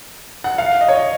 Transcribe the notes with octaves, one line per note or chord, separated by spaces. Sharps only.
F#5
F5
D#5
C#5
D#5